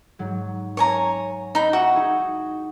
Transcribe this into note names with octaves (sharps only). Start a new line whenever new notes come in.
G#2 F#3
C#5 G#5 A#5
D#4 B5
F#4 E5 G6 C#7
D#4 E4 G#4